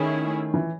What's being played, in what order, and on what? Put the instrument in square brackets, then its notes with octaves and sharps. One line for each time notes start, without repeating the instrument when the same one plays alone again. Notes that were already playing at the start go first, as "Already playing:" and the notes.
Already playing: [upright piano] D#3 [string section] A3 C#4 E4 G#4
[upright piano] E3